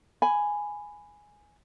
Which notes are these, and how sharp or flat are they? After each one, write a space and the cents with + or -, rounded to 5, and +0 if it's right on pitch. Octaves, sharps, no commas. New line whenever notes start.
G#5 +0 B5 +10